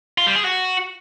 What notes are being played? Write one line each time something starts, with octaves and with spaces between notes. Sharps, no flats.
F4
G3
G#4
F#4